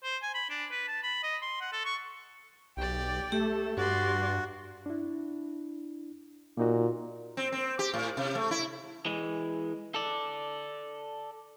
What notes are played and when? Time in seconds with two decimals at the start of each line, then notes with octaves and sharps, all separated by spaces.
0.04 C5
0.22 G#5
0.34 B5
0.50 D4
0.71 B4
0.88 A5
1.03 B5
1.23 D#5
1.42 C6
1.61 F#5
1.73 A4
1.85 C#6
2.77 B1 G4 D5 G5
3.32 A3 G4 A4
3.77 G2 F#4 D5 C6
4.86 D4 E4
6.57 A#2 A#3 D#4 F#4
7.37 C4
7.52 C4
7.79 G4
7.94 A2
8.17 C3
8.35 A3
8.51 E4
9.06 E3 G#3
9.94 A4 D5